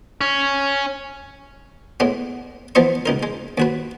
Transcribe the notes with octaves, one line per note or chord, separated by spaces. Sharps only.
C#4
A2 G#3 B3
E3 F3 B3 D#5 C#6
C#2 D#4 A#4
G#3
D#2 F#4 B4